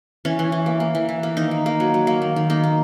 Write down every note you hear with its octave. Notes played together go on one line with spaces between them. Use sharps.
E3 C#4
E3
E3
A#3
A#3
E3
E3
A#3
D#3 D#4
A#3
A#3
F#3
F#3
A#3
D#3
D#3
A#3 D#4
A#3